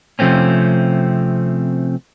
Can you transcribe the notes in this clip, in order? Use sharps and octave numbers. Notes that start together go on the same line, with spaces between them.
C3 F3 A3 C4 C#4